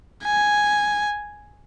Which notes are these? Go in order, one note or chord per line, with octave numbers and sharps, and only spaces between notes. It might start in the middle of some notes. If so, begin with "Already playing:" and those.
G#5